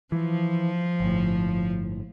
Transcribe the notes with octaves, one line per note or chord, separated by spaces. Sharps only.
E3 F3
G1 A2